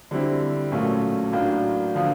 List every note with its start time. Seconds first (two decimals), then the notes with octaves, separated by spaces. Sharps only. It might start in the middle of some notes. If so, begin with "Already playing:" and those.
0.11 D3 G3 C4 E4
0.71 A#1 A#2 F#3 A3 C#4
1.32 A2 F#3 A#3 D4
1.95 D3 F3 A#3